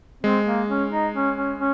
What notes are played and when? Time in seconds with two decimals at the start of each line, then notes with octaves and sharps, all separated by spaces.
0.23 G#3 C4
0.46 A#3
0.68 C#4
0.91 D#4
1.14 C#4
1.36 C#4
1.58 C#4